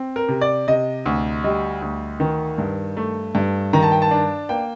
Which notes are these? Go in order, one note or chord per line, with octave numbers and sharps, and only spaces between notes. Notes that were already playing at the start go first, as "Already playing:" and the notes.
Already playing: C4
A#4
C3
D5
C3 D#5
D2
G3 D#5
D2
D#3
G2
A3
G2
D#3 A#5
A5
G5
A5
D4
A#3 G5